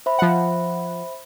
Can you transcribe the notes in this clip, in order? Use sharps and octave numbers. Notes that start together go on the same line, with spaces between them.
C5 E5 B5
F3 F#5